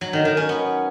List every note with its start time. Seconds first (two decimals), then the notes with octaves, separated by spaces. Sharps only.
0.01 F#3
0.13 D#3
0.25 D#3
0.37 C#4
0.49 B3